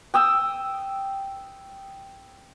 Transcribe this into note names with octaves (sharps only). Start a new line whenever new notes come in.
G5 D#6 E6